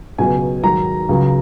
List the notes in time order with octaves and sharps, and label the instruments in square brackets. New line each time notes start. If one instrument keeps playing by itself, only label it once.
[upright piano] C#2 B2 F#3 G#5
G#2 D#3 F#3 A#5
C#2 C#3 F#3